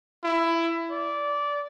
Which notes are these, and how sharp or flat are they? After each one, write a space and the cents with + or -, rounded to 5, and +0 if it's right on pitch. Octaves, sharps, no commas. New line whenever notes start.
E4 +15
D5 -15